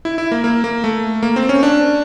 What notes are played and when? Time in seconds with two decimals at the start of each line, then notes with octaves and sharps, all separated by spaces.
0.05 E4
0.18 E4
0.32 A#3
0.44 A#3
0.64 A#3
0.84 A3
1.23 A#3
1.36 C4
1.49 C#4
1.63 D4